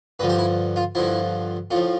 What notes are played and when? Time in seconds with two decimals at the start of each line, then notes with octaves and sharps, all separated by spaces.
0.19 G2 D3 F3 B4
0.29 G4
0.38 E4
0.76 F4
0.95 G2 D3 F3 E4
1.71 A2 F4
1.75 F3